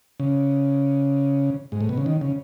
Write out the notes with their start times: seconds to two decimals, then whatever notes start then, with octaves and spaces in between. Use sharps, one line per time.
0.20 C#3
1.72 G#2
1.81 A2
1.89 B2
1.98 C#3
2.06 D#3
2.21 C#3